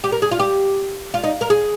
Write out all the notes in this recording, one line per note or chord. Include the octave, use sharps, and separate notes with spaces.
G4
A#4
G#4
F4
G4
F4
D#4
A#4
G#4